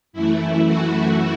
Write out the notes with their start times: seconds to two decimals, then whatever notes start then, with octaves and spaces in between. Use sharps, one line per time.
0.13 F#2 E3 A3 E4
0.66 F#4